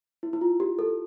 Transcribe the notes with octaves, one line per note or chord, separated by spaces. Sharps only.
E4
E4
F4
G4
A4